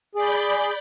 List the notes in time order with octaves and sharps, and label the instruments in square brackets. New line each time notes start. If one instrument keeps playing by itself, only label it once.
[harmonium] G#4 [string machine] D5 B5 G6